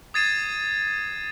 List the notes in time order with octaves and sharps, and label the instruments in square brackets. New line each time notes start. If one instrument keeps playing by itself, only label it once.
[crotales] D#6 G#6 A6 C7 D#7 E7